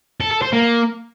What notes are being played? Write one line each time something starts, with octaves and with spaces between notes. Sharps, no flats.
A4
A4
C5
A#3